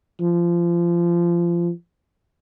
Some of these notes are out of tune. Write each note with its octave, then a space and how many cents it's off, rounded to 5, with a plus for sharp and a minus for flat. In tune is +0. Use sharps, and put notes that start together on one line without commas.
F3 -25